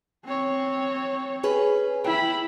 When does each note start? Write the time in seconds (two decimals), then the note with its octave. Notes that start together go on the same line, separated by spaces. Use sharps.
0.25 C4 C#5
1.43 C#4 G#4 B4
2.04 E4 G5 B5